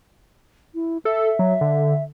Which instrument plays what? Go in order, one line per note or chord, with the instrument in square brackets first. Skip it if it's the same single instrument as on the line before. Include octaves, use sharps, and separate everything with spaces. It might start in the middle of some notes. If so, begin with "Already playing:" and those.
[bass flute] E4
[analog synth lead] A4 [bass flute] E5
[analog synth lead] F#3
D3